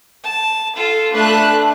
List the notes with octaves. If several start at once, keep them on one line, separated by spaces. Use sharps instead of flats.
A5
F4 A4
A3 D4 B4 F#6